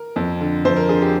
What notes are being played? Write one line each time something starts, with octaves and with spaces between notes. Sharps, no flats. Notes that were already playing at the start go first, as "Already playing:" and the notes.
Already playing: A#4
F2
D3
F2 C5
A#4
D3 G#4
G4